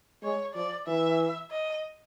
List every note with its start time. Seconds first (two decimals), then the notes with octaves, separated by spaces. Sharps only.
0.23 G#3 C#5
0.54 F3 D5
0.87 E3 E5
1.51 D#5